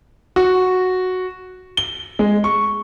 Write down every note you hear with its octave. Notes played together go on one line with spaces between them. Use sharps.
F#4
G7
G#3
C#6